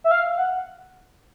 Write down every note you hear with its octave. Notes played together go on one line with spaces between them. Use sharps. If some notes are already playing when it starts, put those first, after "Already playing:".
E5
F5
F#5